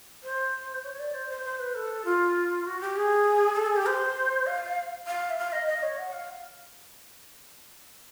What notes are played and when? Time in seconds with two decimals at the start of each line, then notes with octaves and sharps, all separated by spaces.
0.24 C5
0.84 C#5
0.99 D5
1.14 C5
1.30 C5
1.44 C5
1.59 B4
1.75 A4
2.05 F4
2.65 F#4
2.81 G4
2.96 G#4
3.56 A4
3.66 G#4
3.76 G4
3.86 C5
4.47 F5
5.07 F5
5.30 E5
5.38 F5
5.52 D#5
5.68 D#5
5.83 C#5
5.98 F#5
6.13 F5